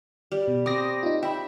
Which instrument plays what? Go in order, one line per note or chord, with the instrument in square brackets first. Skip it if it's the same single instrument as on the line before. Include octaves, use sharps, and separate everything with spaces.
[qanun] G3
[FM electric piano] B2
[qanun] C4 [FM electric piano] D6 D#6 A#6
[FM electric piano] D#4 F4
[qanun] E5 [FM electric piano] G5 B5